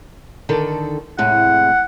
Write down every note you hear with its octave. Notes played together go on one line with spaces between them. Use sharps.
D3 D#3 A4
A2 C3 G#3 F#5